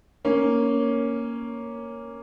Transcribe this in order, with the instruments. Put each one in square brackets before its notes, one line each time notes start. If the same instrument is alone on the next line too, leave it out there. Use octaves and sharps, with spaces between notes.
[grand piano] A#3 C#4